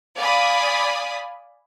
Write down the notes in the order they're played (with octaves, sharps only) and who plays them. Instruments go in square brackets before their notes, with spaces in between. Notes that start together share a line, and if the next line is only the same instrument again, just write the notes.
[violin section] D5 F5 G#5 B5 D#6